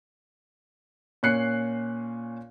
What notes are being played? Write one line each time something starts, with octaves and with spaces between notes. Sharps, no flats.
A#2 C#4 F#6 C7 C#7